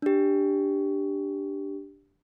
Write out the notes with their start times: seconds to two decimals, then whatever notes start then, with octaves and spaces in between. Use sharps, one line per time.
0.02 D4 G4